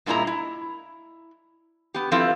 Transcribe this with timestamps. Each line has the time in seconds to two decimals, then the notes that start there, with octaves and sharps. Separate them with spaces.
0.06 G2 A#2 G#3 E4 D#5 A#5
0.27 E4
1.94 B3 G4
2.11 F3 C4 E4 F4 A4 B4